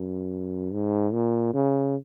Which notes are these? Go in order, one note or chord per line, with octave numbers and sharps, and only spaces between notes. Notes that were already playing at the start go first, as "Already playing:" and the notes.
Already playing: F#2
G#2
A#2
C#3